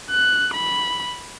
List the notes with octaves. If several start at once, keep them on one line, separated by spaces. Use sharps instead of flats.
F#6
B5